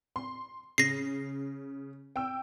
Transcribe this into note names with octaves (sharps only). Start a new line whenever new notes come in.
C6
C#3 A#6 C7
G5 E6